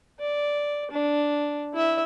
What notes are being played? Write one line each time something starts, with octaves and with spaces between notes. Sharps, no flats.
D5
D4
E4 E5